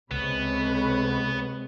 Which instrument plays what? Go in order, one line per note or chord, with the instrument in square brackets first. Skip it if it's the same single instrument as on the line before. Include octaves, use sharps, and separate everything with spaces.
[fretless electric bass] C#2 [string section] C3 G#3 [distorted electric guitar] B3 [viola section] A4 B4 C#5